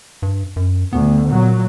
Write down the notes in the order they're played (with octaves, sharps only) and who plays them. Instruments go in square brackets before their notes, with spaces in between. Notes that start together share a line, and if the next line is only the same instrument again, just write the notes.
[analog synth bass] G2
F#2
[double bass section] D2 [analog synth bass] B3
[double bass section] A#2 F#3